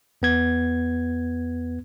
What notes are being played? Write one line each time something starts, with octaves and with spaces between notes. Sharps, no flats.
E2 B3 G#6